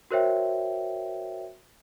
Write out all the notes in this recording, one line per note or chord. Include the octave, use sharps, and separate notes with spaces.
F#4 A#4 C5 C#5 E5 G5